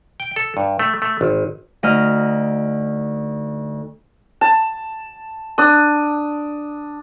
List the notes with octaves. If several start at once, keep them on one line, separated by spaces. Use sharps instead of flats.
G5
A4
G2
A3
A3
G#1
D2 D#4 D#5 A#5 F6
A5
D4 D#6